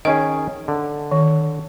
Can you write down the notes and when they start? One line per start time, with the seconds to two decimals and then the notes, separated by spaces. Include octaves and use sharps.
0.05 D#3 C#4 G#4 D#5
0.68 D3
1.11 D#3